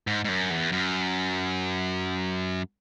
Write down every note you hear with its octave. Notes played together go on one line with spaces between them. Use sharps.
G#2
G#2
F#2
E2
F#2